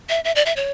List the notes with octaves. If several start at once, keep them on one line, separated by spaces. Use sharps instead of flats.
E5
E5
D5
E5
C#5